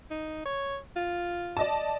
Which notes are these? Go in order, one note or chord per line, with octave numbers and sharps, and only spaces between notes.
D#4
C#5
F4
D5 D#5 A5